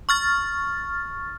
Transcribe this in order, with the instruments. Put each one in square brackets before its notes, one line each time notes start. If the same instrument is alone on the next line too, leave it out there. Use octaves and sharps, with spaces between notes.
[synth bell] C#6 F6 A6